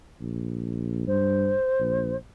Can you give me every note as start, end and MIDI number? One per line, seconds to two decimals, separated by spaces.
0.21 1.06 34
1.08 1.55 43
1.08 2.16 72
1.80 2.14 34